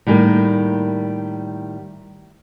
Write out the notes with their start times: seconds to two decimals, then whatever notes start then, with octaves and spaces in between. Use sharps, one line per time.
0.07 A2 D#3 G3 A#3